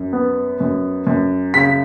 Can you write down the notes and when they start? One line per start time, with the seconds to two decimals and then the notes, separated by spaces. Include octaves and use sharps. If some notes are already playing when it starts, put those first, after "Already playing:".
Already playing: F#2
0.13 B3
0.60 F#2
1.07 F#2
1.54 C#3 B6